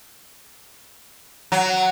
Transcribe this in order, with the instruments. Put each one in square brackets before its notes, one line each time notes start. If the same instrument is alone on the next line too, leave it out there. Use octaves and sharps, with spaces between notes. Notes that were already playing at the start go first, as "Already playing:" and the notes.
[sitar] F#3